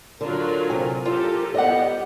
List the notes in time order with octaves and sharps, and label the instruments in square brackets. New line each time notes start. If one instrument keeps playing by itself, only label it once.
[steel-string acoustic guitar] D3 [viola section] F#3 F4 A#4
[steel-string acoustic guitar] C3 G#5
[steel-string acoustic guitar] F4 [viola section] G4 A4 A#4
[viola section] G3 B3 G4 [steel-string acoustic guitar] D#5 F#5